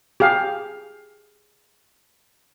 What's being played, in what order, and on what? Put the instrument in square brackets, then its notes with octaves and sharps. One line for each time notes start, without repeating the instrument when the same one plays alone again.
[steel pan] G4 G#4 F5